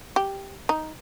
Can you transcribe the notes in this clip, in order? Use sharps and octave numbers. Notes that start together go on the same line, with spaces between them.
G4
D#4